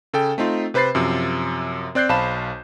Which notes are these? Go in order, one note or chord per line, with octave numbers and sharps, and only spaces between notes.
C#3 A4 G5
A3 C4 D#4 F4
C3 B4 C5 B5 A6 C7
F#2 C3 F3
C4 D5 F#6 G6 C7
B1 C5 F5 A5 B5 E7